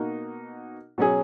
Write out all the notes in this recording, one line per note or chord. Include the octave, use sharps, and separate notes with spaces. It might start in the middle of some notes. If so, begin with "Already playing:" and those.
Already playing: B2 A#3 D#4 F#4
B2 F#3 C#4 G#4